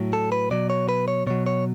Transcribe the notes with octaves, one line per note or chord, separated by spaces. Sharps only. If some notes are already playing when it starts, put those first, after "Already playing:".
Already playing: A2 F#3
A4
B4
B2 F#3 D5
C#5
B4
C#5
B2 F#3 C#5
C#5